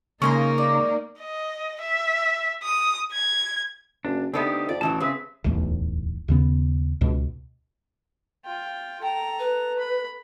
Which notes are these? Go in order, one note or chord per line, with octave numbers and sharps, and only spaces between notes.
C#3 A#3 C#4 D#4 D#5 C6 C#6
D5
D#5
E5
D#6
G#6
F#1 D4
D3 A3 B3 C4 D4 D#4 G4
F2 D5
A1 B2 E3 F#3 A5
C#3 C4 G#4 B4 E5
D1 B1 E2 A3
D#2 C#3 B3
C#2 B2
F4 G5
A4 G5 A#5
B4
B5